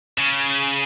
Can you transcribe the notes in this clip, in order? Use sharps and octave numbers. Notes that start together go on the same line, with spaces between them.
C#3